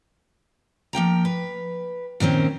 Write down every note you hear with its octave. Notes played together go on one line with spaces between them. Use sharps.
F3 A#3 G5 A#5
B4
A#2 D#3 C4 C#4